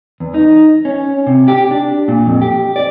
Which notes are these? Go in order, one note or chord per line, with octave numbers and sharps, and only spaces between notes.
E2
D#4
C#4
C3
G4
D4
A#2
F2
G4
D5